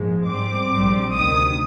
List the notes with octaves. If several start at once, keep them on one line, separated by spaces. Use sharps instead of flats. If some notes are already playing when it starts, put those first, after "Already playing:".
Already playing: A#1 G#2 F3 G#3
G#2 G3 C4 D6
A#1 G#2 G3 C4
D2 C3 D#3 D#6